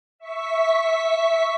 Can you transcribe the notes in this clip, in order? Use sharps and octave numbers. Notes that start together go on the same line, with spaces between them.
E5 C#6 B6